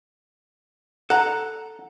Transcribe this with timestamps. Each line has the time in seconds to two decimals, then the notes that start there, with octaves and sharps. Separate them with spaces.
1.10 A4 F#5 A#5